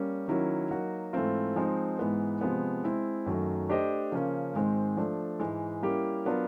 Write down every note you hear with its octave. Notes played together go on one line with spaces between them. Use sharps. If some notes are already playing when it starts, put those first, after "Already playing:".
Already playing: G3 A#3 C#4
D#3 F#3 A#3 C#4 E4
F#3 A#3 D#4 F#4
G#2 E3 A3 C4 F4
F3 G#3 C4 D#4
G#2 E3 G#3 B3
C3 F3 G#3 B3
G#3 C4 E4
F#2 D#3 F#3 A3
A3 D4 G4 C5 D#5
C#3 F3 A#3 C#4
G#2 D#3 G#3 C4
F3 A3 D4
G#2 E3 G#3
G3 A#3 C#4 E4 G4
F#3 B3 D4 F4 A#4